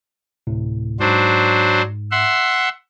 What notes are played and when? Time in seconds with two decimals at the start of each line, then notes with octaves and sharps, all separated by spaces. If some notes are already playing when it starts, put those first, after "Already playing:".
0.47 D2 A2 C3
1.00 G#2 F#3 D4 C5
2.11 E5 F#5 C6